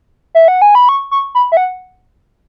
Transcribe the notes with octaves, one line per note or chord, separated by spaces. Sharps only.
E5
F#5
G#5
B5
C#6
C#6
B5
E5
F#5